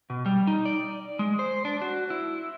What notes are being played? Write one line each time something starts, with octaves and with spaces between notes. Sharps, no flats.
B2
G3
D#4
D5
G#3
C5
D4
F#4
E4